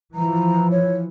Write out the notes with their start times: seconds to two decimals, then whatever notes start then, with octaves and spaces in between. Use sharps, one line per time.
0.15 E3 F3 A#5
0.71 C#5